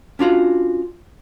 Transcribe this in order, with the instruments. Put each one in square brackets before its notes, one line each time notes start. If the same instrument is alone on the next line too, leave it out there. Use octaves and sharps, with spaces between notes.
[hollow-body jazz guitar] C#4 D4 F4 F#4